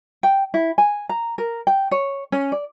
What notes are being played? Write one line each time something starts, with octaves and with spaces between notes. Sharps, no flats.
G5
E4
G#5
A#5
A#4
G5
C#5
C#4
D5